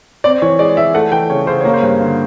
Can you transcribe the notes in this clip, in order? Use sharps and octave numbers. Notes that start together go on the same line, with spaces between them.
C4 D5
E3 C#5
G#3 D5
E3 E5
A3 F#5
E3 G5
C#3 C#5
C#3 C5
A#3 C#5
C5
G2
D3